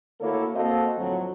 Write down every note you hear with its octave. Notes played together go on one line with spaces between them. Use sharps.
D2 A#3 E4 F#4 A4 C#5
A#3 C4 F#4 A4 D#5 F5
F2 A2 D3 F3 F#3